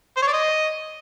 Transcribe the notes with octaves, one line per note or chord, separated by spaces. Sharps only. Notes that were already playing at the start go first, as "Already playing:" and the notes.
C5
C#5
D5
D#5